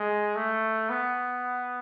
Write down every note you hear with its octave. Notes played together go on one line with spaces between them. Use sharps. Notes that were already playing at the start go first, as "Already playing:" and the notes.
Already playing: G#3
A3
B3